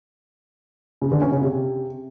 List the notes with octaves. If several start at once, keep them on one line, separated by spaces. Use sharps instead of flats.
C#3
D3
C#4
C#3
C3